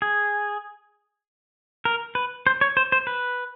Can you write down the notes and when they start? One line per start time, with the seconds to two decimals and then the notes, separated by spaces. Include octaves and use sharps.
0.02 G#4
1.85 A#4
2.15 B4
2.47 C5
2.61 C#5
2.77 C5
2.92 C5
3.07 B4